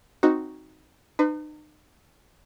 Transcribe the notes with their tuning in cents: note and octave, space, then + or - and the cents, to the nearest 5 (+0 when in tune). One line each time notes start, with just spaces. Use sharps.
C4 +0 D#4 +0 F#4 +0
D#4 -40 B4 +35